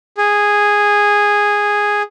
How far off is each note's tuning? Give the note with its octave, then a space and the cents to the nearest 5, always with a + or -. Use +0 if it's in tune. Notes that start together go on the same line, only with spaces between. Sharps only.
G#4 -10